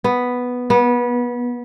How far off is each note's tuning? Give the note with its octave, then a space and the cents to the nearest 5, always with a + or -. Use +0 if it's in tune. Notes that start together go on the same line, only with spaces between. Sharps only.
B3 +0
B3 -25